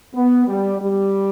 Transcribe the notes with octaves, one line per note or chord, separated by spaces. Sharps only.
B3
G3
G3